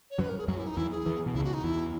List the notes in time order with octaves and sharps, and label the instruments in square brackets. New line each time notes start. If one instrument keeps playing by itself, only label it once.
[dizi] C#5
[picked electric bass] F#2 F#3 [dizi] B4
[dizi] A#4
G#4
[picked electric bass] F#2 F#3 [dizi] F#4
[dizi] E4
D#4
[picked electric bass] E2 E3 [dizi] E4
[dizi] G#4
[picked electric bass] E2 E3
B2
[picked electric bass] C#2 C#3 [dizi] E4
[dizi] F#4
D#4
[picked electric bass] E2 E3 [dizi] E4